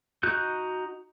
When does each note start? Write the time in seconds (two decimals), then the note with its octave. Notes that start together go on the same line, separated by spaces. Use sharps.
0.23 D#4 F#4 F#6 G6